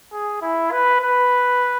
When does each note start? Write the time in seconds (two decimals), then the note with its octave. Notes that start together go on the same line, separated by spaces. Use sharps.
0.13 G#4
0.42 E4
0.72 B4
1.00 B4